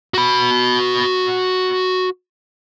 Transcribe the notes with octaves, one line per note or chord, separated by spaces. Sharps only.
F#4 B5